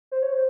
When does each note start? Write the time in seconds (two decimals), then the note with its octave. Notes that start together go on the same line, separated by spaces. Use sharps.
0.12 C5
0.23 C#5
0.33 C5